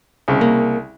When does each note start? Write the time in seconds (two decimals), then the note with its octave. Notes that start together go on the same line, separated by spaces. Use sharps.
0.28 C2 C#3
0.41 A#3